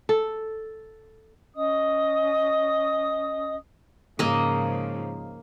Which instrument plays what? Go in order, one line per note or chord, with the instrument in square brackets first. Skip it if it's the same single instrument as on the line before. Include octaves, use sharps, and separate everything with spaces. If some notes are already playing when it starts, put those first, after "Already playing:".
[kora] A4
[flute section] C#4 D#5 D#6
[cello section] G#2 C#3 F3 [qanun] A#3 D#5